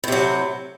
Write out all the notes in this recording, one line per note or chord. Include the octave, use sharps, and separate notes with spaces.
A2 C3 F#3